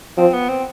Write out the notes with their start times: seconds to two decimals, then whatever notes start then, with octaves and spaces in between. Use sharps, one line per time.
0.17 F3 C4
0.33 B3
0.49 C4